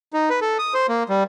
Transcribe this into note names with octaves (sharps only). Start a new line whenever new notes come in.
D#4
B4
A4
D#6
C5
A#3
G3